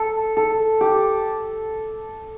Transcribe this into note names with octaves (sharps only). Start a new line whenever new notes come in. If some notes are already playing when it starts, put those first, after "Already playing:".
Already playing: A4
A4
G4